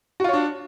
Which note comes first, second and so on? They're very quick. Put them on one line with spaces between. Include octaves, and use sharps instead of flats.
F#4 F4 C#5 D4